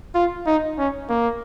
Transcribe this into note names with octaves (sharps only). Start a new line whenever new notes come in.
F4
D#4
C#4
A#3